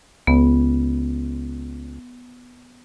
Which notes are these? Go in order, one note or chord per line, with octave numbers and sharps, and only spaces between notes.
C#2 B3